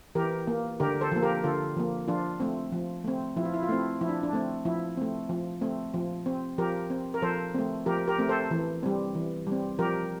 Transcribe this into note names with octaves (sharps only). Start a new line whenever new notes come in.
E3 G4 A#4
A#3
D3 G4 A#4
A4 C5
F3 A#3
G4 A#4
D3 F4 A4
F3 A#3
F3 D4 F4
A3 C4
F3
A3 C4
F3 E4
F4
E4
F4
A3 C4 E4
F3 E4
D4
D4
A3 C4
F3 E4
A3 C4
F3
A3 C4
F3
C4
F3 G4 A#4
C4
A#4
F3 A4 C5
A3 C4
F3 G4 A#4
G4 A#4
A3 C4
A4 C5
E3
G3 C4
E3
G3 C4
F3 G4 A#4